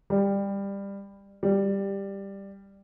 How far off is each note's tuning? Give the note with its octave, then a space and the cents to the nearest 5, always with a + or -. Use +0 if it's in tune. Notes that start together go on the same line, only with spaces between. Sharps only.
G3 +20
G3 +10